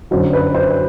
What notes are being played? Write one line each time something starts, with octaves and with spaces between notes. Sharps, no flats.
F#2 D3 F#3 C5
B4
C5